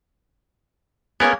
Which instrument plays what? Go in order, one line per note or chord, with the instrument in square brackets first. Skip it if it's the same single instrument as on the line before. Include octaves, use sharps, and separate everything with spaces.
[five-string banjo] A#3 C#4 G#4 [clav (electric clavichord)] B3 A#4